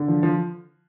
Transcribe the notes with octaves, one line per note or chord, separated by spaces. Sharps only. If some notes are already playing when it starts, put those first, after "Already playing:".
Already playing: D3
F3
F3